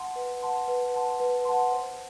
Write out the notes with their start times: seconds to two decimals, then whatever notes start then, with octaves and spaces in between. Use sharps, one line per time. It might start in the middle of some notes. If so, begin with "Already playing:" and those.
Already playing: F#5 A5 C6
0.16 B4
0.42 F#5 A5 C6
0.68 B4
0.94 F#5 A5 C6
1.20 B4
1.45 F#5 A5 C6
1.72 C5